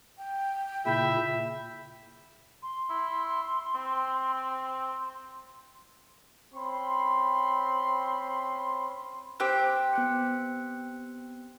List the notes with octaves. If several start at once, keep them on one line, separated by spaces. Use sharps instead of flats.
G5
A#2 C#3 A#3 E4 E5 B5 G6
C6
E4
C4
C4 C#4 B5 C6
C4 G4 C5 G5 D6 F#6
B3 F#6 C#7